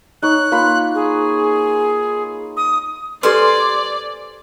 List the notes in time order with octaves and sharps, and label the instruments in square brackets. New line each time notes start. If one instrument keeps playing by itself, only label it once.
[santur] D#4 C#5 [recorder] F#6
[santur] A#3 F4 B5
[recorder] G#4
D#6
[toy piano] G4 A4 B4 [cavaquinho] C5 G#5 C6 [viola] D5